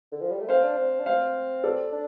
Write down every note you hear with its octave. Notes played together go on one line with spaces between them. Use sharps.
D3
F3
G3
A3
C4 C5 F5
D4
C4
D4
C4 C5 F5
A4 D5
D4